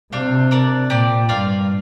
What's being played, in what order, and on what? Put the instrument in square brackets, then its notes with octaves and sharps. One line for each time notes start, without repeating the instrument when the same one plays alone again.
[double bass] C3 [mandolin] D4 F4 C5 F5
[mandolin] D4 A#4 D5
[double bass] A#2 [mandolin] C4 G4 D5
[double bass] G2 [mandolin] F4 A#4 D5 F5